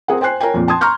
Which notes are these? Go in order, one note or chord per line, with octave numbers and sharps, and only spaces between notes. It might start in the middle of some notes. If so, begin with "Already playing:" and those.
C4 G#4 A#4 F#5
C5 G5 G#5 F#6 C7
A#4 C#5 G5 G#5
F2 A#2
G5 A5 C6 D#6 G#6
A#5 C6 C#6 F6 G6